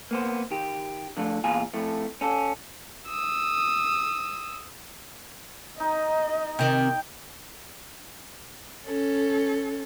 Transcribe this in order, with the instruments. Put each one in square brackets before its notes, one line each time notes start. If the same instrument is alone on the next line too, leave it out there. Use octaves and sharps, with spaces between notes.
[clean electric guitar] A#3 B3 C5
D#3 G4
D3 F3 A3
E2 A#2 F4 G#4 G#5
F2 A2 A3
C#4 A4
[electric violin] D#6 E6
[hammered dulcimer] D#4 [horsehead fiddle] D#5
[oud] C3 D#3 [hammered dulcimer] G5
[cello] C#4 A4